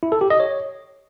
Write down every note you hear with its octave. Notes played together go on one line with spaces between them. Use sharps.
E4
A4
G4
D#5
C#5